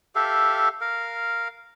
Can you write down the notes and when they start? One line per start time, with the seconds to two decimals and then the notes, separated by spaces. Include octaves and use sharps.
0.15 G4 A4 E5 F5
0.81 A#4 F5